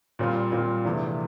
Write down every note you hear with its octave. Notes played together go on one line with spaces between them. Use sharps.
A#2 G3 C4 F4
A#2 G3 C4 F4
E2 C3 F3 A3 D4